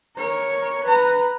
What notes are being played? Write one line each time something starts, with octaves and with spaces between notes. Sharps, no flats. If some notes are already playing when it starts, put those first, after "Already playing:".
A#4 C#5
B4 A#5